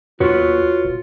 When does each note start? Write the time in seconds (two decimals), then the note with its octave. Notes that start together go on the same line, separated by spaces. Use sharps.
0.20 D#2 F4 F#4 B4 C#5
0.85 D#1